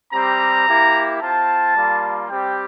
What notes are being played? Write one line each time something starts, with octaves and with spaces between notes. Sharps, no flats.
G3 C4 G4 A#5
A#3 E4 G4
C4 F4 A5
G3 A#3 F4
G3 C4 G4 G5